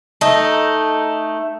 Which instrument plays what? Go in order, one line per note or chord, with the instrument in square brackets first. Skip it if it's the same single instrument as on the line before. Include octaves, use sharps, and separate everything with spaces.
[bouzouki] A3 D#4